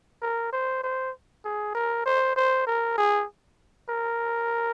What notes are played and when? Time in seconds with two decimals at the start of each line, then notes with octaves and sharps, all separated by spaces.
0.22 A#4
0.53 C5
0.83 C5
1.45 G#4
1.75 A#4
2.05 C5
2.36 C5
2.67 A#4
2.98 G#4
3.89 A#4